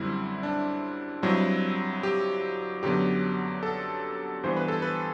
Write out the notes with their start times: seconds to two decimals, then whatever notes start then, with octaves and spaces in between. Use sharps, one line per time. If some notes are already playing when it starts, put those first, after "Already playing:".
Already playing: F#2 D3 G3 C4 E4
0.43 D4
1.23 G2 F#3 C4 E4
2.03 G4
2.83 F#2 D3 F#3 B3 G4
3.63 A4
4.43 G2 E3 B3 C5
4.56 B4
4.68 A4
4.82 B4